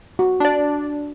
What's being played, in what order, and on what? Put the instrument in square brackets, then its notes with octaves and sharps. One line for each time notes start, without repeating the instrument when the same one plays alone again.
[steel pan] F#4
[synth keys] D4 D5